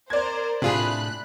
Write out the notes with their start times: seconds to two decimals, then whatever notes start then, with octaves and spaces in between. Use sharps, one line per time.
0.10 A#4 C5 D5 G#6
0.62 A2 C3 A3 D4 F4 G#4 B5 F#6